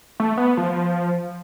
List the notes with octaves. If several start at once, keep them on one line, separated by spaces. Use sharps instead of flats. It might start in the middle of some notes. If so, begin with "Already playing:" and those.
A3
B3
F3